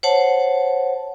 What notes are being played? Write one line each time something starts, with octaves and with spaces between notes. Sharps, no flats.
C5 C#5 F#5 A5